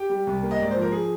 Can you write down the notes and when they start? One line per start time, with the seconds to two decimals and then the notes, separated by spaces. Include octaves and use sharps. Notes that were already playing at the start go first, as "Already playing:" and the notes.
Already playing: G4 G5
0.09 G3
0.27 C2
0.43 A#3
0.51 D#5
0.59 G#2 D5
0.71 F3 C5
0.82 A#4
0.92 G#4